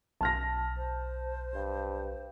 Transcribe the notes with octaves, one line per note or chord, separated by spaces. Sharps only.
B1 A5 F6 A#6
C5
G2